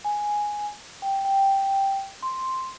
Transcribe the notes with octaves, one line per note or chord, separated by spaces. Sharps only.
G#5
G5
G5
C6